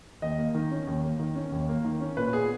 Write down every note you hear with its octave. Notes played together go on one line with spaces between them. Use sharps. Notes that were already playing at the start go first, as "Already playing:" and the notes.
D#2 D#5
A#3
D#3
C#4
D#2
A#3
D#3
C#4
D#2
A#3
D#3
C#4
A#2 B4
B3 G#4